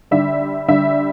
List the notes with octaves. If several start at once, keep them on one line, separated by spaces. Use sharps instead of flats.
D3 G3 E5
D3 G3 E5